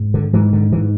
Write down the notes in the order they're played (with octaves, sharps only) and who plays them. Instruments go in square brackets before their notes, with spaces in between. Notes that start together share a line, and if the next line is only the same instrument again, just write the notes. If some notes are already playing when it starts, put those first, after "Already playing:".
Already playing: [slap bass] G#2
D3
G#2 E3
D3
G#2 E3